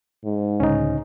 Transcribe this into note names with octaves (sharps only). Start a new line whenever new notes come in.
G#2
C#2 A2 D3 C#4 D#4